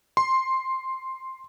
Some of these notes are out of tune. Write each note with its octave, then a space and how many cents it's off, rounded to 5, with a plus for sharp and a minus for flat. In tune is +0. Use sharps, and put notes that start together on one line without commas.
C6 +5